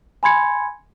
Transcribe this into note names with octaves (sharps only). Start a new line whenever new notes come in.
G#5 B5 C6 G#6 C#7